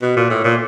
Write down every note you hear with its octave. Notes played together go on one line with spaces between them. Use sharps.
B2
A#2
A2
A#2